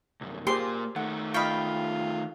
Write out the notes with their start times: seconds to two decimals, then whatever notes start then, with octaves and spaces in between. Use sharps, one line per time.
0.21 C2 F#2
0.47 A#2 A#3 G4 G#4 C5 C6
0.96 D#3 A3 F#5
1.34 F4 D#5 F5 G5 B5 C#6